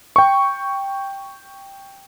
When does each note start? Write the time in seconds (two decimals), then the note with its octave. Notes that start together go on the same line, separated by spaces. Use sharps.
0.16 G5 C#6